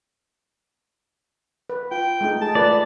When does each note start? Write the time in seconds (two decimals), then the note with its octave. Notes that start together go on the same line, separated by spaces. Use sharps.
1.70 B4
1.91 F4 G5
2.21 G#3 A3 D#4
2.41 G#4 A5
2.55 A3 F4 B4 D5